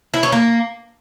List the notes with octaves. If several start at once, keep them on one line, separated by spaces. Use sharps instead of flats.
E4
C#4
A#3